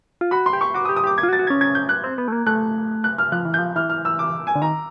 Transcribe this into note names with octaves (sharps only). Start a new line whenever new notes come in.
F4
F#4 B5
C6
G4
C#6
F#4 D6
D#6
G4
D#6
G4 D6
G#6
F4
F#4
A6
F#4
C#4 G#6
G#6
G6
F#6
C4
B3
A3
A#3
A3 F#6
F#6
F6
F3 F#6
E3
F3 G6
E3 F6
F6
E6
D6
G#5
D3
D#3 A#5